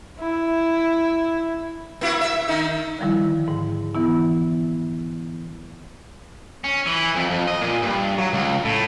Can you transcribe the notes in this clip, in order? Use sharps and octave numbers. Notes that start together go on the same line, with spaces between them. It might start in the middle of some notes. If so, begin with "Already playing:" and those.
E4
A#3 E4 F#4
E5
D#3 D#4
D3 D#3 F3 G3 E4
G#2
E3 B3 E4
C#4
E3
F2
F2
D#5
A#2
G2
F#3
C#2
A2